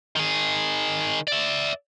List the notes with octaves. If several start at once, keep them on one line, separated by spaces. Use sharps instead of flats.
D#3 G#4
D5 E5